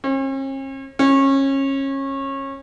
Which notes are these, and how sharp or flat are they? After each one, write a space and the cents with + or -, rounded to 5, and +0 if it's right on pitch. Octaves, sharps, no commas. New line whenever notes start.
C#4 -45
C#4 -25